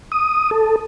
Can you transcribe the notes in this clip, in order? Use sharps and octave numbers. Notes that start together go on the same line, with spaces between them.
D#6
A4